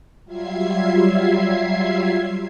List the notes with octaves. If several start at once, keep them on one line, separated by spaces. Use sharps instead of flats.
F#3 G3 F4 E5 G#6 C7